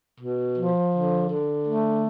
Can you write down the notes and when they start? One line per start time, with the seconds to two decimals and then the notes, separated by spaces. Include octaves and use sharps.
0.20 B2
0.57 F3
0.93 D3
1.29 D3
1.66 A3